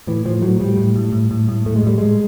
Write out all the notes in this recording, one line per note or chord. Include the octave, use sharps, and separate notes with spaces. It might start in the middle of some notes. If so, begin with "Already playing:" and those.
A2 E3
A2 F3
A2 F#3
A2 G3
A2
A2
A2
A2
A2
A2 A3
G#3
A2 G3
A2 G#3